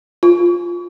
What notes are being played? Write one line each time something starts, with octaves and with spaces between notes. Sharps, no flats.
F4